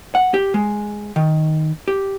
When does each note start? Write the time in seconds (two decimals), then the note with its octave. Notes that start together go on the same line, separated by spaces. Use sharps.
0.15 F#5
0.34 G4
0.54 G#3
1.16 D#3
1.88 G4